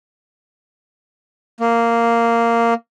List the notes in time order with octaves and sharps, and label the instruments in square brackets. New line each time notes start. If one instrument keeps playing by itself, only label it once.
[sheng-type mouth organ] A#3